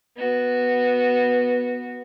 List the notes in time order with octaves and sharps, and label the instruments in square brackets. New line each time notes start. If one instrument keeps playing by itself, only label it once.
[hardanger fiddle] B3 F#4